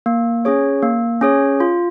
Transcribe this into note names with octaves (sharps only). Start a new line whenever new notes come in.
A#3
C#4 G#4 C#5
A#3
C#4 G#4 C#5
F4